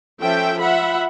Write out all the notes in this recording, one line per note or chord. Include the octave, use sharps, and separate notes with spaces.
F3 C#4 A4 E5 G5
F4 E5 F#5 B5